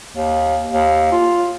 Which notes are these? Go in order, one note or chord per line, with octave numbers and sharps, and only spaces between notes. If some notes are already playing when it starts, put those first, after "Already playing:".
D#2
D#2
F4